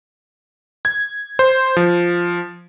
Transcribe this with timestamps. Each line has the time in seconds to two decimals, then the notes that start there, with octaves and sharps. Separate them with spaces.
0.85 G#6
1.39 C5
1.77 F3